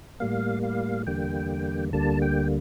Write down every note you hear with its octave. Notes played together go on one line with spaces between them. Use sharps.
A2 G3 A#3 F5
F5
E2 D3 G3 A#3 G5
D2 D3 G3 A#3 A5
G5